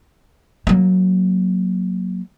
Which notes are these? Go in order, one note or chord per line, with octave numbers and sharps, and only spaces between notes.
F#3 A#3